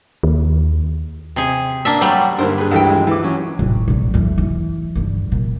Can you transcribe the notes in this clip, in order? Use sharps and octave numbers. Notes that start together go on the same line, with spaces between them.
D#2
C3 G#4
A#3 D4 E5
F#3 G3 A3
G2 D3 A#3 D4 A#4 C5 C6
G#4 B4
C#2 E3 A4 E5 G5
F3 G#3
E3 D6
F#3 C#4
D#1 A1
A#1 G3
F2 E3
E3
G2 D3
A#2